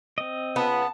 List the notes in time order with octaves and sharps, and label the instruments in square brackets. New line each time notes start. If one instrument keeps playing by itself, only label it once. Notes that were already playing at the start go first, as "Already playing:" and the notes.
[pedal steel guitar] C4 D#5
[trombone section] C#3 F4 B4 [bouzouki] B3 [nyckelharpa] A5